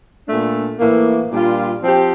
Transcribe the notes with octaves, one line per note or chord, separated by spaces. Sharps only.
A#2 A3 D4
A2 E3 A#3
A#2 G3 D4 F4
F3 C4 G4